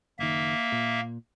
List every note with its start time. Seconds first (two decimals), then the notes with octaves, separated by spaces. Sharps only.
0.19 F#1 D#3 A#3 E5
0.72 A#2